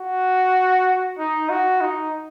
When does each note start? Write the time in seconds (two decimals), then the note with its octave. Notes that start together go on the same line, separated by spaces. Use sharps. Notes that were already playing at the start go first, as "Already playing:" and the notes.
Already playing: F#4
1.19 D#4
1.50 F#4
1.81 D#4